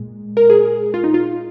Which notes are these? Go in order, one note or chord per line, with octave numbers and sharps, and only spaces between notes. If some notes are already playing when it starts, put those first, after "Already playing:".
Already playing: A#2 G#3
A#4
G#4
F4
D#4
F4